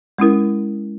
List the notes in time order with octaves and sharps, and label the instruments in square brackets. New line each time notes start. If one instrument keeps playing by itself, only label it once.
[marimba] G#3 C#4 E4 A#4